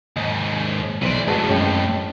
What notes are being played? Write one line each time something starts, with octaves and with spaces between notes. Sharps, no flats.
D#2 G#2 D#5
B1 E3 C5 D5
F2 A2 G#3 F#4 B4 A5
F#2 G#3 C#4 C#5 G5